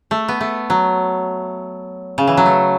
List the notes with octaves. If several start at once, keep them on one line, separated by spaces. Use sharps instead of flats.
A3
B3
A3
F#3
C#3
E3
F#3
A3